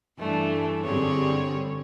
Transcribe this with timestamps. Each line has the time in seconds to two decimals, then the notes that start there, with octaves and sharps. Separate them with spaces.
0.19 G2 E3 A3 D4
0.84 G2 D3 G3 C4 G#4 C#5